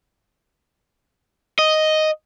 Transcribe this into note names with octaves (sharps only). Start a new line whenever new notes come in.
D#5